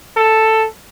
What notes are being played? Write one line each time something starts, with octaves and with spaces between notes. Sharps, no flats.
A4